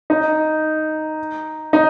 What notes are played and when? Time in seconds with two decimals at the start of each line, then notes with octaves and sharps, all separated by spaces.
0.10 D#4
1.73 D#4